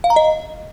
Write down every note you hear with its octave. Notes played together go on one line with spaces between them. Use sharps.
F5
A#5
D#5